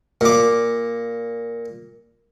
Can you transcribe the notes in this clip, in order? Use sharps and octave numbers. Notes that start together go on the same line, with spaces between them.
A#2 D6